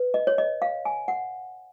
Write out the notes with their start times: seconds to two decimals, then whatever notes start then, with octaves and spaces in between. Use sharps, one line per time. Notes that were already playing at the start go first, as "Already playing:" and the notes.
Already playing: B4
0.14 D#5
0.27 C#5
0.38 D#5
0.62 F5
0.85 G#5
1.08 F#5